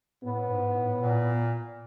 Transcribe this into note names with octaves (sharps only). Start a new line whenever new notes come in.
A2 B3
G#2
A2
A#2